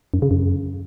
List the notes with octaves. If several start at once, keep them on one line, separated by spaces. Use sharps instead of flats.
F#2
C#3
F#2